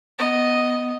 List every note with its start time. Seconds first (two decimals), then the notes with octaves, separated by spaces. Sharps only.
0.19 B3 D#5